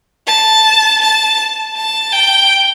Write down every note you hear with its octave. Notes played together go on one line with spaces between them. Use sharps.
A5
A5
A5
G5